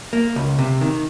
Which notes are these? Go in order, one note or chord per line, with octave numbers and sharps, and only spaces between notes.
A#3
C#2
C3
D#3